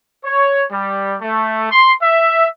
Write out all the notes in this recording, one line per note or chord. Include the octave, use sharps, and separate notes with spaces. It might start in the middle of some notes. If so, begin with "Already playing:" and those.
C#5
G3
A3
C6
E5